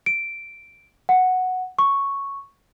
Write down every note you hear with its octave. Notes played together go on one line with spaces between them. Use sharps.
D7
F#5
C#6